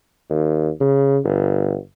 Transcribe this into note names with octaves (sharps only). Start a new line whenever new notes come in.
D#2
C#3
G1